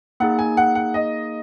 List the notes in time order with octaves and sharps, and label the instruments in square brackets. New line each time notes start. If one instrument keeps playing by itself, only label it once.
[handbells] A#3 D#4 G#4 [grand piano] F#5
[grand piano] G#5
F#5
F#5
D#5